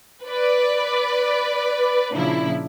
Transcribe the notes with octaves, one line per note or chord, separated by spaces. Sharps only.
B4 D5
A#2 C#3 F3 D4 E4